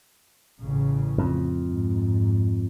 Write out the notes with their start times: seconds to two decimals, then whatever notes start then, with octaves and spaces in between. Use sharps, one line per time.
0.63 A1 C#3
1.18 F2
1.65 G#2